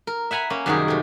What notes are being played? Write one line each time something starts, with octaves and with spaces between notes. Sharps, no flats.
A#4
E5 F#5 G#5 A#5 B5
A#3 C#4
F#2 C3 D#3 G3 F#4 G#4
C3 A3